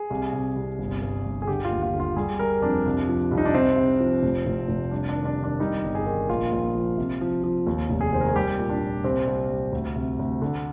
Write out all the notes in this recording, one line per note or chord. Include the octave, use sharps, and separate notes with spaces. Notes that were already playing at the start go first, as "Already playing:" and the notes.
Already playing: G#4
C2
C3
C2
G1
G2
G1
G#4
D3 G4
F4
D#2
F4
D3
F4
G3 G#4
G3 A#4
F2 D4
C2
F3
C2
D#4
D4
C3 C4
C3
F3
F1
F1
F1
G3 D4
D4
D#3
D4
D#3
D4
G3 D#4
G1
G#4
D#3
A#1 F4
A#1
F3
C3
F3
F3
D#2
F1
G#4
D#3 C5
A#4
G#4
G3 G4
A#2
D4
A#2
C2 C4
C2
G3
D2
C3
D2
D3